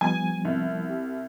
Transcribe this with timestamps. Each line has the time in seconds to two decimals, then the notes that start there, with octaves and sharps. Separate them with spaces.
0.01 F3 G3 B3 G#5
0.45 C2
0.90 G4